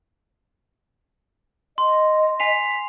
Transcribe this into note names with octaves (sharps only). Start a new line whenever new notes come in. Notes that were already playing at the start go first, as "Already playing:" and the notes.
D#5 C6
G#5 B6 C7 F7